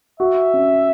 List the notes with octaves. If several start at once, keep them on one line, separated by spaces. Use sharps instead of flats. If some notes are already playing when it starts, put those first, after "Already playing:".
F#4 E5
C#4